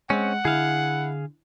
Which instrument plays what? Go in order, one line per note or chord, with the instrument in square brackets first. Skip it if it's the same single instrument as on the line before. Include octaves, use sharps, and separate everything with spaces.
[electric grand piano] G#3 [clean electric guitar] C4 C#4 [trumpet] F#5
[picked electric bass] D3 [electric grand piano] E4 [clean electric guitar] G#4 F5